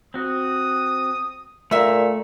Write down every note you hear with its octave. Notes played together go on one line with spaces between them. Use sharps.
C4 F#4 D#6
A#2 D3 A3 E5 A#5